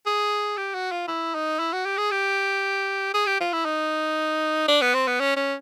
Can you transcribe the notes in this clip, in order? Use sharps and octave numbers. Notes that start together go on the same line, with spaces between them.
G#4
G4
F#4
F4
E4
D#4
E4
F#4
G4
G#4
G4
G#4
G4
F4
E4
D#4
D4
B3
C4
B3
C#4
C#4